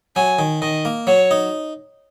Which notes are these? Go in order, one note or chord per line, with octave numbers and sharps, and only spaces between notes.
F#3 G#5
D#3
D#3 D#5
A#3
F#3 C#5
D#4